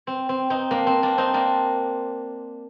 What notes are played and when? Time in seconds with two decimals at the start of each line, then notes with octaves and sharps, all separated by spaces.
0.07 C4
0.29 C4
0.50 C4 D#4
0.71 A#3 D4
0.87 C4
1.03 A#3 D4
1.18 C4 D#4
1.34 A#3 D4